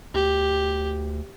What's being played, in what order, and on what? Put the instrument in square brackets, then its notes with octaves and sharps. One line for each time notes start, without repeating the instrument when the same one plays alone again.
[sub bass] D2 [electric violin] G4